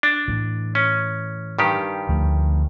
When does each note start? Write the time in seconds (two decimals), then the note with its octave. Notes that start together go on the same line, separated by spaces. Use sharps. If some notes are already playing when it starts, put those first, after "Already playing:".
0.03 D4
0.28 A2 E3
0.75 C#4
1.59 G2 D#3 G4
2.09 D2 F3 A3